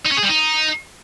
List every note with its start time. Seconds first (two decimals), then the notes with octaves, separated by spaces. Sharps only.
0.05 D#4
0.11 C#4
0.17 G#4
0.23 G3
0.28 D#4